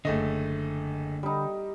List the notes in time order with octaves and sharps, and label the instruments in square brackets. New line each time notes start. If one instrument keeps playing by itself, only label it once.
[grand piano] F#1 A3 D#5 [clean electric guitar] D3
[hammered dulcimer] G3 D#4